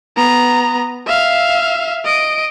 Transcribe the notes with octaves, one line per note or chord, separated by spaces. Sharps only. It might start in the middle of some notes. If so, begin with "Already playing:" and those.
B3 A#5
E5 F5
D#5 D7